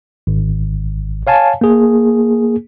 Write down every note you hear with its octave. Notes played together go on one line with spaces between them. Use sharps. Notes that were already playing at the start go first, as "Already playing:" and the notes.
G#1
C#5 F5 G#5 A5
A#3 G#4